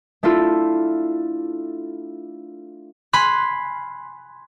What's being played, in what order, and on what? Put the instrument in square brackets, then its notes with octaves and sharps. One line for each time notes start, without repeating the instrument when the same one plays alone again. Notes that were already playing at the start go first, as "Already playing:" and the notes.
[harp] A3 D4 E4 F4 A4
G#5 B5 C6 F6 F#6